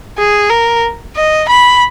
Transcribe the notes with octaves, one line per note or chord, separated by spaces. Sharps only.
G#4
A#4
D#5
B5